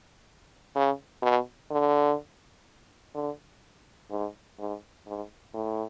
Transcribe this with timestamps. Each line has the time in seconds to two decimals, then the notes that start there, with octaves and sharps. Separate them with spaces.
0.75 C#3
1.23 B2
1.71 D3
3.15 D3
4.11 G#2
4.59 G#2
5.07 G#2
5.54 A2